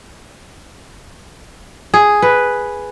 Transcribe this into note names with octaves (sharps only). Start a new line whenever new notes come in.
G#4
B4